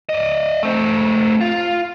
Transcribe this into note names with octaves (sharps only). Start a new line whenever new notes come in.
D5 D#5
A3 C4
F4